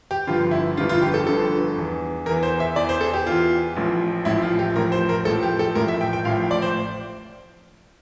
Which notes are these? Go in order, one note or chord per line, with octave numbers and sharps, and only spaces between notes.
G4
G1 G2 D3 F3 F4
E4
G1 G2 D3 F3 F4
F4
G4
A4
G1 G2 D3 F3 A4
E2 E3
E2 E3 A#4
C5
E5
E2 E3 D5
C5
A4
G4
E2 E3 F4
A1 A2 F3
A1 A2 F3 E4
F4
G4
A1 A2 F3 A#4
C5
A#4
A1 A2 F3 A4
G4
A4
A1 A2 F3 A#4
E5
G5
G5
A1 A2 F3 F5
D5
C5